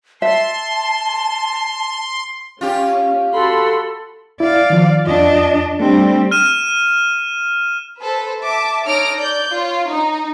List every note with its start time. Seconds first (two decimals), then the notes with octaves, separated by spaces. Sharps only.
0.22 E5 A5 C6
2.61 C#4 F4 G4
3.33 F#4 A4 B5 C6
4.40 E4 D5 F5
4.70 D#3 F3
5.07 F2 D4 F4 D5 D#5
5.80 G3 A3 C4 D4 G4
6.31 F6 D#7 E7
8.00 A4 B4 C5
8.42 E5 A5 D6
8.86 D#4 A4 C#5 F6 A#6 D7
9.17 D5 G6
9.53 F4 C#5
9.90 D#4